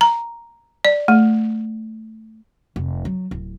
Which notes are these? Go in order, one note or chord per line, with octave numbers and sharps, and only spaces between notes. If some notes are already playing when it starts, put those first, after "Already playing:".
A#5
D5
A3
F1
F#3
D1